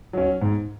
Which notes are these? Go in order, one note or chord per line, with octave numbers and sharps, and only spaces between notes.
F#3 C#4
G#2